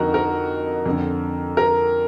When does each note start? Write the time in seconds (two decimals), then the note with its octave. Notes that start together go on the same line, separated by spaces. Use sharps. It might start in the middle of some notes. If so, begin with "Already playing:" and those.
Already playing: F2 D3 D#4 F#4 A#4
0.14 A#4
0.86 F2 D3
1.57 A#4